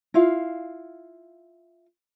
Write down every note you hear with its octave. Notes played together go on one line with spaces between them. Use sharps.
E4 F4 F5